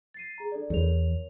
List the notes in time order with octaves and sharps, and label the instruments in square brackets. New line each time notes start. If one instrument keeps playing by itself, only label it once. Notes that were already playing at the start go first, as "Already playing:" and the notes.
[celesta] A6 C7 D#7
G#4 A#5
D4 A4 D5
[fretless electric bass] E2 [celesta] A#4 C#5 F7